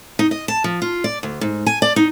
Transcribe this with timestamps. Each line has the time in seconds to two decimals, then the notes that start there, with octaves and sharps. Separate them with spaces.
0.19 D#4
0.31 D#5
0.48 A5
0.64 F3
0.82 F4
1.04 D5
1.23 D2
1.41 G#2
1.66 G#5
1.82 D5
1.96 D#4